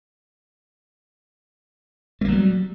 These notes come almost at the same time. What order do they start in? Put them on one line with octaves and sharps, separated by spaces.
A3 A#3 F#3 G3